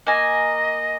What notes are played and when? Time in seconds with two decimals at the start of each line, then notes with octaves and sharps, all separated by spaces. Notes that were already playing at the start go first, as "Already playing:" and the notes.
0.07 A#3 D#5 G#5